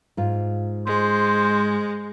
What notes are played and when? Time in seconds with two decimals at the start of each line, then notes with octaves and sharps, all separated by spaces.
0.17 G#2 F4
0.87 G#3 C5